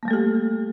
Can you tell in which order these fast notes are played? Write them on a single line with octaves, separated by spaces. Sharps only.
A#3 G3 A3 A4 G4